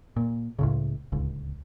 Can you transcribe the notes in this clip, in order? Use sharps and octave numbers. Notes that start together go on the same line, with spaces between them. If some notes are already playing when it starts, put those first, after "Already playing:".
A#2
C#2 A2 C#3
D1 C#2